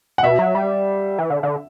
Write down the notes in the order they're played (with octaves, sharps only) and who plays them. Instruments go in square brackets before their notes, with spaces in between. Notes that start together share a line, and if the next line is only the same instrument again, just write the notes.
[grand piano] F#5
[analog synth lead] B2 [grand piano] E5
[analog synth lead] F#3
G3
E3
D3
D3